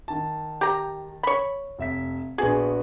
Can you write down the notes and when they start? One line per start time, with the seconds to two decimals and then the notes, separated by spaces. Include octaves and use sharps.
0.08 D#3 A5
0.61 G4 A#5
1.23 C#5 B5
1.79 F1 E5 B6
2.38 A#1 B3 F#4 G#4